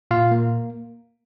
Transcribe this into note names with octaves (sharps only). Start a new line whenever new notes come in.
A#2 F4 F5
A#3